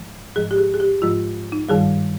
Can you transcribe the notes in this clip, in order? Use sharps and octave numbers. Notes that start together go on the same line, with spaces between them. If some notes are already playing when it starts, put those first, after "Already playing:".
Already playing: G#2 F3 G#3
G#2 F3 G#3 G#4
G4
G#4
G#4
G4
G#2 F3 G#3 F4
D#4
G2 D#3 G3 G#4